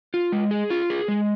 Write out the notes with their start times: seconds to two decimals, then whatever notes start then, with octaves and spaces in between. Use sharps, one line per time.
0.14 F4
0.32 G#3
0.51 G#4
0.70 F4
0.90 G#4
1.08 G#3